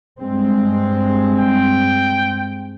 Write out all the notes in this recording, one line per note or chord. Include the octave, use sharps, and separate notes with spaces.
G2 G#3 C4
G5